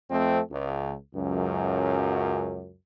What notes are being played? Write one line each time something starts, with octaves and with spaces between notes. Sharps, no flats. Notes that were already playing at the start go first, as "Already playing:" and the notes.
F2 A3 C4
C#2
C#2 F#2